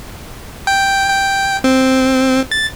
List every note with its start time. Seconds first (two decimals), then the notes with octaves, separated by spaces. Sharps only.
0.67 G5
1.10 G5
1.64 C4
2.51 A6